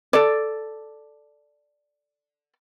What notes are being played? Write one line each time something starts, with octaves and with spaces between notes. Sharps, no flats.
A4 D5